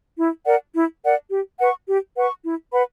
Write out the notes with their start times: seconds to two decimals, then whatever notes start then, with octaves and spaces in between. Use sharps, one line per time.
0.17 E4
0.45 A#4 D5 F#5
0.74 E4
1.03 A#4 D5 F#5
1.30 G4
1.59 B4 F#5 C#6
1.87 G4
2.15 B4 F#5 C#6
2.44 E4
2.72 B4 F#5 B5